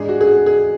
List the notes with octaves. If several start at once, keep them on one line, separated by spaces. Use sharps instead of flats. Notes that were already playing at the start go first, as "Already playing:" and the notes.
Already playing: G#2 G#3 D4 G#4
F#4
G#4
F#4
G#4